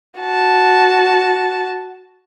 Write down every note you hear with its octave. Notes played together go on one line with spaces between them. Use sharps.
F#4 A5